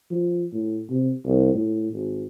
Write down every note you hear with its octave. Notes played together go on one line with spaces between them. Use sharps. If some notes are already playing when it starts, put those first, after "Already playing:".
F3
A2
C3
C2
A2
G#1